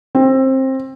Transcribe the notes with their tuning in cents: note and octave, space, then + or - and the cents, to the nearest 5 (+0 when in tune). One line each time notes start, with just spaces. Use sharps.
C4 +20